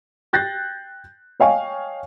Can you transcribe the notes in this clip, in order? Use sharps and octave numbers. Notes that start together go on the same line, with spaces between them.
G5 F#6 G6 A6 A#6 C7
C#5 D#5 F5 G5 G#5 C#6